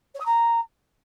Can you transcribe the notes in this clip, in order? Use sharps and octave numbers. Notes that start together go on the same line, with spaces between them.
C#5
D#6
A#5